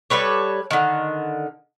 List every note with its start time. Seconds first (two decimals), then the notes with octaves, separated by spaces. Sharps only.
0.10 G3 A4 B4 C#5
0.71 D3 D#3